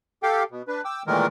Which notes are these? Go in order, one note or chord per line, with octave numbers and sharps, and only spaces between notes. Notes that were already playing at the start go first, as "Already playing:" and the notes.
G4 A4 F5 G5
B2
D4 B4
G5 D6 E6
A#2 D#3 E3 G#3 A3 A#4